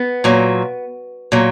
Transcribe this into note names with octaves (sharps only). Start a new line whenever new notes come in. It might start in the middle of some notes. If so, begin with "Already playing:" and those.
Already playing: B3
A#2 F#3
A#2 F#3